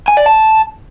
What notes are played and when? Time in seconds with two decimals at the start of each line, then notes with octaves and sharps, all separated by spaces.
0.08 G#5
0.17 D5
0.26 A5